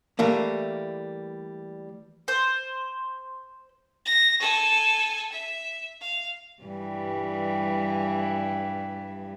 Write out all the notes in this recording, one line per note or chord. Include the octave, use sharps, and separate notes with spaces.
E3 G3 A3 A#3
C5
A#6
A4 G#5
E5
F5
G2 E3 G3